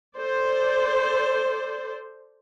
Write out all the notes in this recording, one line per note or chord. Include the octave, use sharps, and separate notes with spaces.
A4 C5 D5